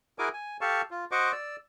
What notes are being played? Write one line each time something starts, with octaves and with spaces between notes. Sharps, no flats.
E4 F#4 G#4 A#4 G#5 D6
G#5
G4 A4 F5 A5 C#6
F4
F#4 C5 D#5 C#6 D6
D5 E6